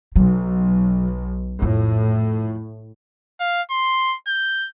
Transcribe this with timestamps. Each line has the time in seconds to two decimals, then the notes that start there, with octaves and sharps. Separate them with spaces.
0.16 B1 F#3
1.62 F2 A2
3.40 F5
3.71 C6
4.27 G6